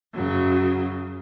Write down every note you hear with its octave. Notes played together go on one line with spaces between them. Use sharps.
F#2 C#3 F#3